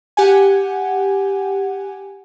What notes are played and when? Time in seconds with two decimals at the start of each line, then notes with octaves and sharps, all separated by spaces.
0.17 G4 F#5 G#5